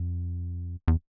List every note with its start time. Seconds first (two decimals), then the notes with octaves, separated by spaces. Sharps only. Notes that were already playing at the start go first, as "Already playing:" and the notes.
Already playing: F2
0.88 E2